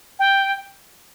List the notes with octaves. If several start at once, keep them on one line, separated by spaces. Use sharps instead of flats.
G5